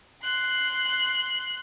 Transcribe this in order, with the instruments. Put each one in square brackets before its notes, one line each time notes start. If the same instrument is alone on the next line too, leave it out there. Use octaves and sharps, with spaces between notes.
[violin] C6 F#6